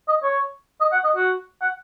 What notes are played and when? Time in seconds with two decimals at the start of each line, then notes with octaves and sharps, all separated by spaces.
0.08 D#5
0.23 C#5
0.81 D#5
0.92 F#5
1.04 D#5
1.16 F#4
1.61 F#5